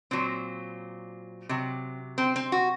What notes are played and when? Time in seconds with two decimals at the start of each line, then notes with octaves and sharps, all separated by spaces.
0.11 A#2 F#3 C4
1.49 C3 F#3
2.18 C4
2.36 C4
2.52 F#4